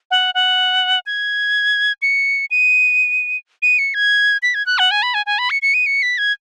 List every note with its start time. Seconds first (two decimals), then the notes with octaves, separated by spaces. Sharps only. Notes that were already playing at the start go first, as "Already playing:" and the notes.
0.11 F#5
0.35 F#5
1.06 G#6
2.02 C#7
2.51 D#7
3.62 D#7
3.79 C#7
3.94 G#6
4.43 B6
4.55 G#6
4.66 F#6
4.79 F#5
4.91 G#5
5.03 B5
5.14 G#5
5.26 G#5
5.39 B5
5.50 C#7
5.62 C#7
5.74 D#7
5.86 C#7
6.03 B6
6.18 G#6